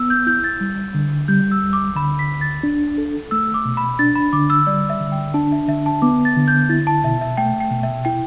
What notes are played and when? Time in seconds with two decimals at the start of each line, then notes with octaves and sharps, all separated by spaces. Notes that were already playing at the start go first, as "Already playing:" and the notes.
Already playing: B3 E6
0.10 G6
0.27 E4 G6
0.44 A6
0.61 G3
0.94 D3
1.28 G3 G6
1.52 E6
1.63 D2
1.73 D6
1.96 D3 B5
2.19 B6
2.30 D2
2.41 A6
2.63 D4
2.98 A4
3.31 A3 E6
3.54 D6
3.65 B2
3.77 B5
3.99 D4 A6
4.16 B5
4.33 D3 D6
4.50 E6
4.67 G3 D5
4.90 E5
5.01 D3
5.12 G5
5.34 D4 A5
5.52 E5
5.68 D3 E5
5.86 A5
6.02 B3 D6
6.25 A6
6.36 D3
6.48 G6
6.69 E4 A6
6.87 A5
7.04 B2 E5
7.21 E5
7.38 A3 G5
7.60 G5
7.71 B2
7.83 E5
8.05 E4 G5